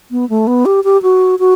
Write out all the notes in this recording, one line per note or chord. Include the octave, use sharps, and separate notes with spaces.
B3
A3
B3
G4
G4
F#4
F#4